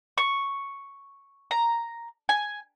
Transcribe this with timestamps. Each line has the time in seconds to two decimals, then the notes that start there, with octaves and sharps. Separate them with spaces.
0.18 C#6
1.51 A#5
2.29 G#5